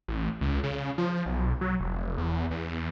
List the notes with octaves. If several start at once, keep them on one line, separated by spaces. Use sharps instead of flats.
A1
C#2
C#3
F3
B1
F#3
F1
E2
E2